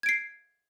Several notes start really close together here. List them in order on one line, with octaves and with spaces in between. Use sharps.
G#6 D7 C7